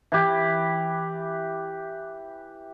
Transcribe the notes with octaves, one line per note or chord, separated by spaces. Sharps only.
E3 G4